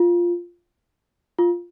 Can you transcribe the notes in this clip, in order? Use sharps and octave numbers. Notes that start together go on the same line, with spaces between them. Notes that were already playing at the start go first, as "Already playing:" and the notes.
Already playing: F4
F4